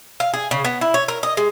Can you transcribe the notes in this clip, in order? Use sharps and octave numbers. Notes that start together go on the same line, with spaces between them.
F5
G#4
C#3
B3
E4
C#5
A#4
D#5
G#3